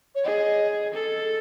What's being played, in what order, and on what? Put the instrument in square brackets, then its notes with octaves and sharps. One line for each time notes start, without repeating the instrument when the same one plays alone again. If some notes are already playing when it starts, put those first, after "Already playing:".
[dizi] C#5
[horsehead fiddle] G#4 [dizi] D#5
[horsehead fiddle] A4